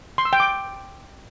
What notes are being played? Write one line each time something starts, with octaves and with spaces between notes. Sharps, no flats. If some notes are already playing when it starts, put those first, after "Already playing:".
C6
E6
G5
D6